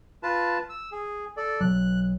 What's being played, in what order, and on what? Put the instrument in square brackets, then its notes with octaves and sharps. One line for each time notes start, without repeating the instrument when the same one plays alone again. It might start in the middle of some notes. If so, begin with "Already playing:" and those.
[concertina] F4 B4 A5
E6
G#4
A4 D5
[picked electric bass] B1 F#3 [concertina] F#6